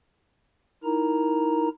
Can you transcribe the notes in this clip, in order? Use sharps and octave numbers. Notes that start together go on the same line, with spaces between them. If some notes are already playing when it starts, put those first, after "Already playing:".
D#4 E4 A#4 A#5